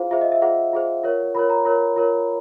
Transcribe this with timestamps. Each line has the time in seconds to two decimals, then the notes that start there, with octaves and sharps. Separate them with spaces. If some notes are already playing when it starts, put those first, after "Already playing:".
Already playing: F4 G#4 C5 F5
0.11 F4 G#4 C5 E5
0.21 D#5
0.32 E5
0.42 F4 G#4 C5 F#5
0.73 F4 G#4 C5
1.04 F4 A#4 C#5
1.35 F4 A#4 C#5 B5
1.50 A#5
1.65 F4 A#4 C#5
1.96 F4 A#4 C#5